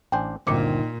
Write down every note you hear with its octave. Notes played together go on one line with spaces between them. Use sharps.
A1 D4 C5 G5 G#5
G1 D2 A#2 D#3 C4 D#4 D6 C#7